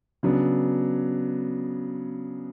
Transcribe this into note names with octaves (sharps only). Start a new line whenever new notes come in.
C#3 F#3 B3 D4